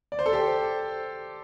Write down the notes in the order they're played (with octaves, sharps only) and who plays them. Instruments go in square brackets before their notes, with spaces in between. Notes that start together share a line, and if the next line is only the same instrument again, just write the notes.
[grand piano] D5
C5
A4
G4 C5